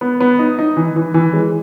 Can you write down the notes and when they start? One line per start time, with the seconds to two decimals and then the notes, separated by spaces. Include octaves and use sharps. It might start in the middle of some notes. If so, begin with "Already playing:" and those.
0.01 B3
0.20 B3
0.39 D#4
0.59 D#4
0.77 E3
0.96 E3
1.14 E3
1.34 G#3